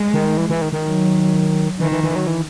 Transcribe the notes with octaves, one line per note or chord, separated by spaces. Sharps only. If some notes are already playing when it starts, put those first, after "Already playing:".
Already playing: G#3
D#3
E3
E3
D#3
D#3
F#3
D#3 E3
E3
E3
F#3
E3